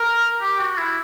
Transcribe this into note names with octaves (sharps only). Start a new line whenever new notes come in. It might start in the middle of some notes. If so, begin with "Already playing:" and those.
Already playing: A#4
G4
F#4
E4